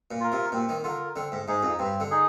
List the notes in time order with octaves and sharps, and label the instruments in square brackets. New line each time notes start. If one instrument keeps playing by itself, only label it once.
[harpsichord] A#2
[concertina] F4 A#4
[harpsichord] C3
[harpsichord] A#2 [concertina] C4
[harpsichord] D#3
[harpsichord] D3 [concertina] F4 A#4
[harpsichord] D3 [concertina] C4
[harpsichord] G#2
[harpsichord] G#2 [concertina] D#4 G#4
[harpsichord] F2
[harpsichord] G2 [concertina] C4
[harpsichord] D3
[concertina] D#4 G#4